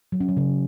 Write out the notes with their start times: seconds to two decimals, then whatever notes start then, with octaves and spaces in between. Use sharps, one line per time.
0.12 F#3
0.20 C#4
0.29 F#3
0.37 C#3